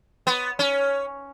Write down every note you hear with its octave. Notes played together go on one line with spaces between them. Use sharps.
B3
C#4